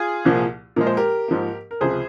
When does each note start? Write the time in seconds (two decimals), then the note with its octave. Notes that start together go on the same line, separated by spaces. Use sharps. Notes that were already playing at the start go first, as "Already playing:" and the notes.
Already playing: F4 G#4
0.25 C2 A#2 F3 A#3
0.76 A#2 F3 G#3 A#4
0.87 C5
0.97 G4 A#4
1.28 G#2 F3 A#3
1.71 A#4
1.81 C#2 C3 F3 G#4 C5